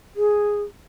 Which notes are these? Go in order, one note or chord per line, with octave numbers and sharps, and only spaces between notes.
G#4